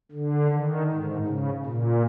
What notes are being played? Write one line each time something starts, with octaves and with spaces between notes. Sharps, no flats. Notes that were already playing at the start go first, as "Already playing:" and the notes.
D3
D#3
G#2
C#3
A#2